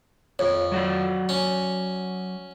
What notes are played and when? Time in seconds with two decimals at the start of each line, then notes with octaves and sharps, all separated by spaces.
0.39 F2 C#5
0.72 F#3 F#4 D5
1.29 C#4